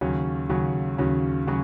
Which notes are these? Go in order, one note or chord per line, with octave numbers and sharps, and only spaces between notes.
D#2 C#3 F#3 C#4 F#4
D#2 C#3 F#3 C#4 F#4
D#2 C#3 F#3 C#4 F#4
C#3 F#3 C#4 F#4